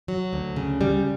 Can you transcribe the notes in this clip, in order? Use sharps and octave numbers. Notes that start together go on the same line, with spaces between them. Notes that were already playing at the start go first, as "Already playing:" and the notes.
F#3
D2
C#3
G3